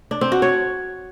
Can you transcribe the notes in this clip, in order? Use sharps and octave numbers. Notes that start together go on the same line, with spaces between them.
D4
C4
F#4
C#5